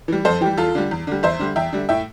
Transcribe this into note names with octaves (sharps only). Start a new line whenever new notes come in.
E3 G3
F2 A4 C5
E3 G3 G4
E2 F4 A4
D3 G3
E2
D3 G3
E2 C5 E5
D3 G3
E2 E5 G5
D3 G3
A2 E5 G5